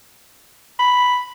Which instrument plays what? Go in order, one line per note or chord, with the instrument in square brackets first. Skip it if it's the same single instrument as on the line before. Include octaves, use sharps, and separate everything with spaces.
[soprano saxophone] B5